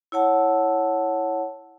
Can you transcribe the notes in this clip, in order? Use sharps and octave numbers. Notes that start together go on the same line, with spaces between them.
E4 C#5 F#5 A5